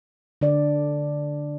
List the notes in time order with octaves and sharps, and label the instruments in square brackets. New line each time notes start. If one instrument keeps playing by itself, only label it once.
[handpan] D3 D4 D5